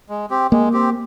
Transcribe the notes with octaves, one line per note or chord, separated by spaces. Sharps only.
G#3
C4 G4
G#3 A#3
C4 G4